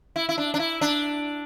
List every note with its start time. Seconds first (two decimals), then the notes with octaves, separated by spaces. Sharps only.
0.16 E4
0.29 E4
0.38 D4
0.54 D4
0.59 E4
0.81 D4